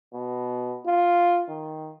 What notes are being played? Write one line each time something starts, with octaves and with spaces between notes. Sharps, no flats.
B2
F4
D#3